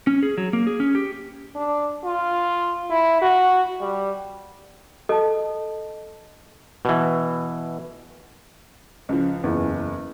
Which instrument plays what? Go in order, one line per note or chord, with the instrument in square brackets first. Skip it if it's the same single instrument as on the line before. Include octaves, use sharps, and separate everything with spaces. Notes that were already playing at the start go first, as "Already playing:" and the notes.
[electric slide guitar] C#4
G#4
F#3
A#3
G#4
C#4
G4
[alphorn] D4
F4
E4
F#4
G3
[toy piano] A4 [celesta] D#5 A5
[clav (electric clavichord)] B2 E3
[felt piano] C#2 F3
F#1 E2